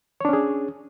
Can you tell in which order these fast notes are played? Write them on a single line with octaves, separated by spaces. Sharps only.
C#5 D4 C#4 G#4